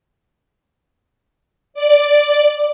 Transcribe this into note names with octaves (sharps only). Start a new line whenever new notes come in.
D5